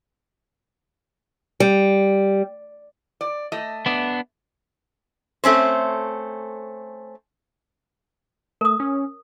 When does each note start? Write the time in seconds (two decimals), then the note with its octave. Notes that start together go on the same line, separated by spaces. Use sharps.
1.60 G3
3.21 D5
3.52 A3 D#5
3.86 B3 D4
5.44 A3 C4 C#4 C5
8.61 A3 A#4 D#6
8.80 C#4